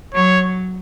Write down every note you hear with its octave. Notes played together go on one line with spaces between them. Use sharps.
F#3 C#5